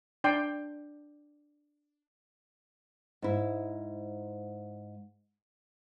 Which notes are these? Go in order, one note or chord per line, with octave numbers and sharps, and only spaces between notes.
D4 D5 G5 C6
G#2 E4